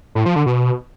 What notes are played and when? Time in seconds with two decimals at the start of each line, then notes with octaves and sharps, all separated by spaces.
0.15 A2
0.26 F3
0.36 D3
0.46 B2